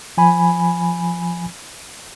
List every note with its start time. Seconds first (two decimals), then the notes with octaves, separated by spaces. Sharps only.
0.18 F3 G#5 B5